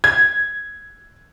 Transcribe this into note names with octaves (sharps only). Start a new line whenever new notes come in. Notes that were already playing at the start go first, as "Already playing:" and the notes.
G#6